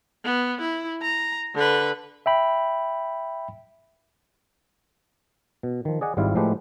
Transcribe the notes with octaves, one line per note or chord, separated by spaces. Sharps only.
B3
E4
A#5
D3 B4
E5 G5 B5
B2
D#3 F3
G#4 D5 D#5 F#5 G#5
G#1 G#2 G3 E4 F4 F5
A2 F3 G#3 A3 G4 B4